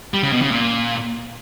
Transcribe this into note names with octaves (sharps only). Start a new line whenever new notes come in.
G3
C#3
B2
C#3
A#2